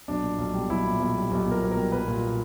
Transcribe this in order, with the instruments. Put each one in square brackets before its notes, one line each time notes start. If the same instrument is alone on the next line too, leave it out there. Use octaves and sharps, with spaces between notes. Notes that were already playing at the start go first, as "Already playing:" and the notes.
[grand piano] B1 D4
A#2
B1
G3
B1 E4
A#2
B1
G3
B1 G4
A#2 A#4
B1
A#4
G3
B1 B4
A#2